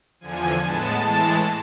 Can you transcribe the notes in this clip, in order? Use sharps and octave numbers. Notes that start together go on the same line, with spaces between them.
E2 D3 F3 G#5
A2 G#3 B3 A5
A2 E3 G#3